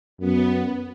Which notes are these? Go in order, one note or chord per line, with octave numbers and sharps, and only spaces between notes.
F#2 B3